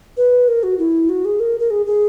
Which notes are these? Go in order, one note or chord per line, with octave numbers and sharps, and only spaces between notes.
B4
A#4
F#4
E4
F#4
G#4
A#4
A#4
G#4
G#4